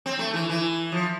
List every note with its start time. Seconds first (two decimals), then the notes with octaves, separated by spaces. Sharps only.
0.06 C4
0.19 A3
0.34 E3
0.49 E3
0.92 F3